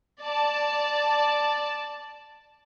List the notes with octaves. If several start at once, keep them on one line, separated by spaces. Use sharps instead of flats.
D5 A5